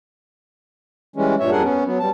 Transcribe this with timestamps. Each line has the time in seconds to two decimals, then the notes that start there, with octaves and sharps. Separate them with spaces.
1.16 E3 G3 G#3 C#4
1.40 G2 A#2 C#5 E5
1.51 F2 G3 D4 G#4 A#4 F#5
1.63 B3 C#4
1.85 F#3 B3
2.00 G3 A5